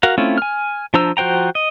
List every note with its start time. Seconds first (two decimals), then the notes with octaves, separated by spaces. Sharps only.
0.03 F#4 A#4 F5
0.18 A3 C4 C#4 E4 F4
0.38 G#5 F6
0.94 F3 D4 C5 A#5 E6
1.17 F3 F#4 C5 G5 A#5
1.55 D#5